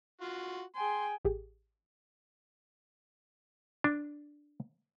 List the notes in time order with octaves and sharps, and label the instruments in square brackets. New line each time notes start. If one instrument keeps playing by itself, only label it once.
[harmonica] F4 F#4
[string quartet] G#4 G5 G#5 [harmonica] C6
[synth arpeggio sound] A1 G4 G#4
[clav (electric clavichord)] D4